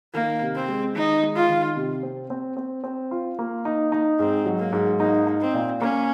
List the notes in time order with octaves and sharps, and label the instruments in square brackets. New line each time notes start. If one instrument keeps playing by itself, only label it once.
[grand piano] D#3 [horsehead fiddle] A#3
[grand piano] C3
[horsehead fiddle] C4
[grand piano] G#3
[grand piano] D#3 [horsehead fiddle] D#4
[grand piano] G#3
[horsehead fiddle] F4
[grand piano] D#3
C3
C4
C4
C4
C4
F4
A#3
D#4
D#4
[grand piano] G#2 [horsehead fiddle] C4
[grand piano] F#3
[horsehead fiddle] A#3
[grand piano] G#2
[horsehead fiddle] A#3 [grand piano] D#4
[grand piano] D#4
[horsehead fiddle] C4
[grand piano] A#2
[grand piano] A#3 [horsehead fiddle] C#4